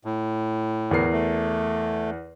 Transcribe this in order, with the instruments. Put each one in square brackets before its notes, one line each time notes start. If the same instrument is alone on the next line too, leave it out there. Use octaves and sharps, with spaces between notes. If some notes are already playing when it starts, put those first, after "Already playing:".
[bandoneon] A2
[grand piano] E2 A#4 C7
[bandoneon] A3